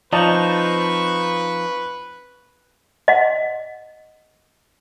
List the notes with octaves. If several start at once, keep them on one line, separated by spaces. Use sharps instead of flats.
F3 C4 D#4 B4 D5 D#5 A5 C#6
D#5 F#5